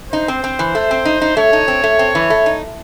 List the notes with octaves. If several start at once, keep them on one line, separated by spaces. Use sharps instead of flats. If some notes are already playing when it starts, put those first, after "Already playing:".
D#4 C5
C4
C4
E3
A3
C4
D#4
D#4
A3 C#5
D#4
C4
A3
C4
E3
A3
D#4